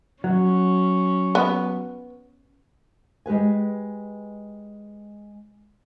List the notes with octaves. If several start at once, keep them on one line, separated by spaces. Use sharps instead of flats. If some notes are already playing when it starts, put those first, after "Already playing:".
F#3 C#4
B3
G#3 G4 B4 G#5